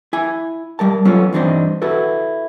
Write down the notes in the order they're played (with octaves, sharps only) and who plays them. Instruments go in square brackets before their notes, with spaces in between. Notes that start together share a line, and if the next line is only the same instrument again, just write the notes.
[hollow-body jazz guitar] E4 G#5
G3 A#4 A5
F3 F#3 B3 C#4 F4 A4
G2 E3 C4 D4 D#4 C5
E4 F#4 A4 B4